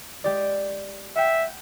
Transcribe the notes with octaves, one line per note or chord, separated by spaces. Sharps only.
G#3 G4 D5
E5 F#5 G5